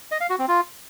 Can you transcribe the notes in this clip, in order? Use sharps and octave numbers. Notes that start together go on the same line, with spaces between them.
D#5
F5
F#4
C4
F4